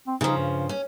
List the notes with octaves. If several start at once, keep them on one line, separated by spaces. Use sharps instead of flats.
C4
C#3 F3 D#4
G2
C#4